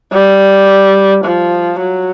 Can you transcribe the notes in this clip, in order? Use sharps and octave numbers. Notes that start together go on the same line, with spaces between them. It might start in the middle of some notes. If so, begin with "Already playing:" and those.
G3
F3
F#3